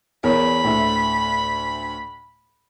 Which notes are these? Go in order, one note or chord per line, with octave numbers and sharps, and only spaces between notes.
E2 A#4 C#5 B5
D2 A2 E5